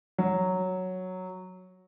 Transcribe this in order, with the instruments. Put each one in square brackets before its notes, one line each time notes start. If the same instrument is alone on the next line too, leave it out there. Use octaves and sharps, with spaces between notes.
[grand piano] F#3